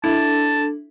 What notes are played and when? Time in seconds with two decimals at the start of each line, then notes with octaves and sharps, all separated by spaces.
0.04 D4 E4 A4 A5